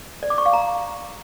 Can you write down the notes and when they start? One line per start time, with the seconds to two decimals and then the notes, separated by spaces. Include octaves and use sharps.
0.23 D5
0.30 D6
0.38 C#6
0.46 F5
0.53 A#5